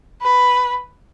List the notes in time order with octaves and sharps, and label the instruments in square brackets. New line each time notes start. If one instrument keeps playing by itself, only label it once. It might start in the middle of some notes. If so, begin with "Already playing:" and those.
[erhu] B4